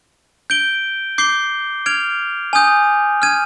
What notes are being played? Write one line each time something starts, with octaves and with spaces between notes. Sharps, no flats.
G6 D7 G7
D6 G6 C7 G7
F6 G#6 D7 F7
G#5 D#6 G6
F6 G#6 D#7